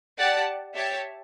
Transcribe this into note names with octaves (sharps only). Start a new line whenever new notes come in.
G4 D5 F#5 A5
G4 C#5 E5 A5